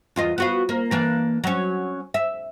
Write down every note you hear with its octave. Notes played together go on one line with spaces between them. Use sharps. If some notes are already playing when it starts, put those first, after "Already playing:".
E2 F4 D#5
B3 F#4 F5
A#3
E3 A#3 D4
F#3 C#4
E5